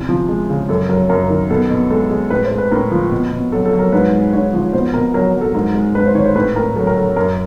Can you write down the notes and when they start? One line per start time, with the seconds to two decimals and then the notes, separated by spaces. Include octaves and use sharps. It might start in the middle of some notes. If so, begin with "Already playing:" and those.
Already playing: E2 C3
0.09 F3
0.29 G#3
0.49 C#3
0.69 F#2 A4
0.89 F#3 A#4
1.09 F#2 A#4
1.30 D#3
1.50 B2 A4
1.70 B2
1.90 G#3 A4
2.11 G#3
2.30 A2 B4
2.44 C5
2.51 G#3
2.58 B4
2.71 A2 A#4
2.91 F3
3.12 B2
3.32 B2
3.52 F#3 A4
3.66 A4
3.73 F#3
3.79 A#4
3.92 G#2 B4
4.13 G#3
4.33 G#2 C#5
4.54 F3
4.73 B2 C5
4.94 B2 A#4
5.14 F#3 A#4
5.34 F#3
5.41 A4
5.54 G#2 A#4
5.75 G#3
5.95 G#2 B4
6.05 C5
6.15 D#3 C#5
6.26 C5
6.35 A2 B4
6.56 A2 A#4
6.76 F#3 A4
6.87 A#4
6.96 F#3 A4
7.16 F#2 A#4